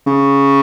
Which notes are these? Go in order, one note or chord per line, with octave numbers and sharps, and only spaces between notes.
C#3